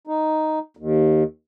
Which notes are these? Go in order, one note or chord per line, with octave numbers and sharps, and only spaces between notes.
D#4
D#2